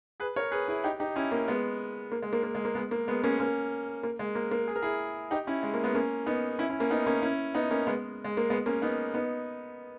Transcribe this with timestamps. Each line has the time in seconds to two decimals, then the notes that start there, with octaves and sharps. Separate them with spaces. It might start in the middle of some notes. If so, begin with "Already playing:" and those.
0.20 G#4 B4
0.36 A#4 C#5
0.51 G#4 B4
0.68 E4 G#4
0.84 D#4 G4
1.00 D#4 G4
1.16 C#4 E4
1.32 A#3 C#4
1.48 G#3 B3
2.12 A#3
2.23 G#3
2.33 A#3
2.43 A#3
2.55 G#3
2.65 A#3
2.75 G#3 B3
2.91 A#3
3.08 G#3 B3
3.24 A#3 C#4
3.40 A#3 C#4
4.03 A#3
4.19 G#3
4.35 A#3
4.51 A#3
4.68 G#4
4.76 A#4
4.82 E4 G#4
5.31 D#4 G4
5.47 C#4 E4
5.63 G#3
5.74 A#3
5.84 G#3 B3
5.95 A#3 C#4
6.26 B3 D#4
6.59 C#4 E4
6.70 C#4 E4
6.80 A#3 C#4
6.90 B3 D#4
7.06 A#3 C#4
7.22 C#4 E4
7.55 B3 D#4
7.70 A#3 C#4
7.87 G#3 B3
8.25 G#3
8.37 A#3
8.50 G#3 B3
8.66 A#3 C#4
8.82 B3 D#4
9.14 B3 D#4